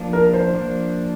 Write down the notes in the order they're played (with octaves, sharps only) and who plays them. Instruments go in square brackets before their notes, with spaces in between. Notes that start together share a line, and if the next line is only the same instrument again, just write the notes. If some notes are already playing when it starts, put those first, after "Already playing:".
Already playing: [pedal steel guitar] F3 A#3 D4
[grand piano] A#4
C5
[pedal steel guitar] F3 A#3 D4